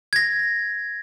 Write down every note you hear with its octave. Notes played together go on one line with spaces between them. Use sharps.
G#6 A#6